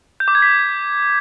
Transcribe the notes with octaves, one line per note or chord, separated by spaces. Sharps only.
G6
D6
G#6
B6